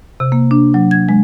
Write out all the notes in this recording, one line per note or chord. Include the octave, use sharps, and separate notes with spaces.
C3
A#3
D4
F#3
G#6
G#3